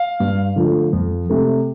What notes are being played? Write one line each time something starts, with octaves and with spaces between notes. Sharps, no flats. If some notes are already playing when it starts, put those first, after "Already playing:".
Already playing: F5
G2
D3 F3 A3
F2
C3 A3